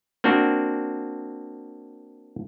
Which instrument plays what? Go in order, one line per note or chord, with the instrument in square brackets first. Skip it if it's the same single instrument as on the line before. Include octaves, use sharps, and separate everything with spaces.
[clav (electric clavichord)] A#3 C4 D4 F#4